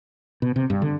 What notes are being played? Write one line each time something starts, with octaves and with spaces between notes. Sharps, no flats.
B2
C3
G2
D3